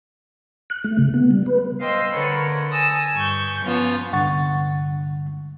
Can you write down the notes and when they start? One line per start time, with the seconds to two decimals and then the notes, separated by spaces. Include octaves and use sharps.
0.70 F#6
0.84 A3
0.99 C#3
1.14 B3
1.31 G3
1.46 B4
1.80 C5 D#5 F5 G5 C6 E6
2.11 D3 A#4 B4 C#5 B5
2.71 G#5 A5 D#6 E6 A#6
3.15 G2 C#6 G6
3.64 F3 B3 C#4 F4
4.12 C2 G2 D3 F#5 C#6 A6